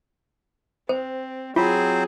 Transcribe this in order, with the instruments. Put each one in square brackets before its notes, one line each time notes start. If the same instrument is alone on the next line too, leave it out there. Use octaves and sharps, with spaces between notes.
[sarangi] C4 [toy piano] C5
[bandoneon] F#3 C4 C5 [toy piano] F4 [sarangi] G#4